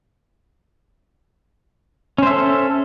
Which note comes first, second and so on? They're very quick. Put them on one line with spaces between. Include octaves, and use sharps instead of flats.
C#4 C5 E5 A4